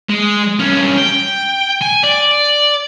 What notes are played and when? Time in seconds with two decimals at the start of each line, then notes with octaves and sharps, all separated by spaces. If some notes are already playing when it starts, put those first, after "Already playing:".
0.09 G#3
0.60 G2 C#4
0.98 G5
1.82 G#5
2.04 D5